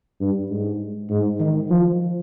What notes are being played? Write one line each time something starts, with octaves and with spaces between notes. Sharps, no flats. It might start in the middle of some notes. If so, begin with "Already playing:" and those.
G2
G#2
G#2
D#3
F3